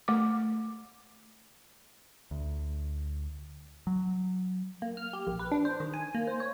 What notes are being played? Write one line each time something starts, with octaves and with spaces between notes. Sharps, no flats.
A3 D6
D2
F#3
A#3
F6
G4
A#1
B4
D4
C5
D#3
G#5
A#3
C5
C#5